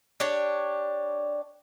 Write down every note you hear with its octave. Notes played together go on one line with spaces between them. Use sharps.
D4 G4 C#5